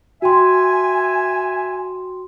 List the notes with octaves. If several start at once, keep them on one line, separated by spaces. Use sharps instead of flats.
F#4 E5 G5 G#5 C6